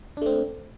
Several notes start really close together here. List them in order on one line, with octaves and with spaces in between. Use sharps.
D4 A3 C4